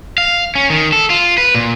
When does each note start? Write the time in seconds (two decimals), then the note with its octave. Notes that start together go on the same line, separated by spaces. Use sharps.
0.18 F5
0.55 C#4
0.70 D#3
0.93 A4
1.10 F4
1.38 B4
1.55 A#2